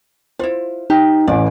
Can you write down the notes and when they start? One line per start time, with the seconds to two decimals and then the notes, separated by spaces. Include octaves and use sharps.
0.39 E4 F4 C5
0.90 D#4 G4
1.28 A1 E3 D5